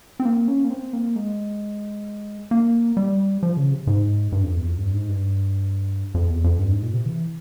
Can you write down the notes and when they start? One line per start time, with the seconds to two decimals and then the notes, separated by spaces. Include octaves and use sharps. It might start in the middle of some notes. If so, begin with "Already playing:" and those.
0.20 C4
0.25 A#3
0.48 C#4
0.64 A#3
0.70 C4
0.93 A#3
1.16 G#3
2.51 A#3
2.97 G3
3.43 F3
3.57 C#3
3.72 C3
3.87 G#2
4.32 G2
4.44 F2
4.56 E2
4.67 F2
4.78 G2
4.94 G#2
5.09 G2
6.14 F2
6.29 E2
6.44 F2
6.59 G2
6.71 G#2
6.82 A#2
6.93 C3
7.06 E3